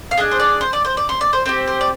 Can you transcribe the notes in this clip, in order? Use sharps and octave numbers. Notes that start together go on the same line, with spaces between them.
F5
D4 G#4 D#5
C5
D5
C5
D5
C5
D5
C5
D5
C5
C4 G4 C5
C5
D5